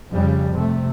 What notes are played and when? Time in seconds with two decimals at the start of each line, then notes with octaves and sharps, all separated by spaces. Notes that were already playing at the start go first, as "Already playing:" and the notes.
0.10 F2 C#3 G3
0.50 C3 A3